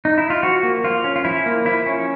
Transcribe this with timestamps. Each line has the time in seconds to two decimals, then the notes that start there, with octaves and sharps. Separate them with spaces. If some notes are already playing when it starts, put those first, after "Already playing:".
0.05 D#4
0.18 E4
0.30 F4
0.43 F3 F#4
0.63 A#3
0.84 F3 F4
1.04 C#4
1.16 F4
1.24 F3 E4
1.46 A#3
1.65 F3 E4
1.86 C#4